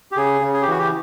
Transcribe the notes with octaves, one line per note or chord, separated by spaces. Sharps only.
G4
C#3 G#4
C#3
G#4
G4
E3 F#4
G4